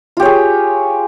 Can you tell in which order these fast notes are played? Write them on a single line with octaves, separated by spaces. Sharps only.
F4 G4 C#5 G#4